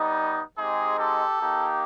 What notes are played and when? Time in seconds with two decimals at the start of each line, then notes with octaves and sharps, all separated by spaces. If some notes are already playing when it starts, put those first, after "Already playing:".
Already playing: G3 B3 D#4
0.57 G#3 C4 D#4 G4 G#4
0.98 G4 A4
1.39 A#3 D#4 G4